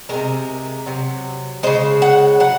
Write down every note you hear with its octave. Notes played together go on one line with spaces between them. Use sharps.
C3 D#3 G#3 A#4
C3 F#3
C#3 G#3 C5
F#5
F#3 F#5